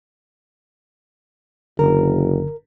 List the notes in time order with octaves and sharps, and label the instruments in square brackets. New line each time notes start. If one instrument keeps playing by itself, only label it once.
[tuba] F#1 [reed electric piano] D3 [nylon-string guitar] A#4